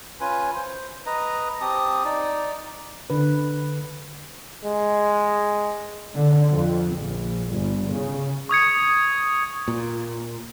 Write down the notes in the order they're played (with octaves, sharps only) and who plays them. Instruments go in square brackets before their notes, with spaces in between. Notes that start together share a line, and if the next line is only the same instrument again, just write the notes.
[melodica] C#4 F4 B4 G#5
C5
B4 D#5 A#5
C4 G4 A5 D#6
D#4 D5
[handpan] D3 B4
[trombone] G#3
[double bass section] D3
F2
A#1
G1
C#3
[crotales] C#6 D#6 G#6 C#7
[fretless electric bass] A#2